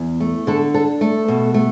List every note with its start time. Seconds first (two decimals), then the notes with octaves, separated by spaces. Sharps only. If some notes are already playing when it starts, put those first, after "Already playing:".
Already playing: E2
0.20 A3
0.47 D3 A4
0.74 D4 A4
1.01 A3 A4
1.28 B2
1.54 A3